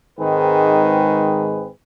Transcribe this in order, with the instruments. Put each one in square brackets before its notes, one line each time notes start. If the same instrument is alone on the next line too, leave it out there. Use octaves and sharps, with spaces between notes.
[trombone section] G#2 D#3 G#3 C4 G#4 B4